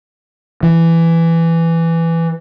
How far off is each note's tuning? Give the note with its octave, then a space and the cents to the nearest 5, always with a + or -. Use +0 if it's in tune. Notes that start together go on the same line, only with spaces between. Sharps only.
E3 +10